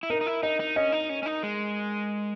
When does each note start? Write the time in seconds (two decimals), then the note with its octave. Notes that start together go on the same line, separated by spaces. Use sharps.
0.03 E4
0.10 D#4 A#4
0.21 D#4
0.26 E4
0.43 D#4 D#5
0.60 D#4
0.76 C#4 D#5
0.92 D#4
1.09 C#4
1.23 C#4
1.26 D#4
1.43 G#3